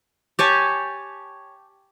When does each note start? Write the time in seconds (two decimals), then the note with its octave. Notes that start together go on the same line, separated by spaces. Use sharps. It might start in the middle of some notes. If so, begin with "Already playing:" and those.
0.39 G4 C#5 G#5 A5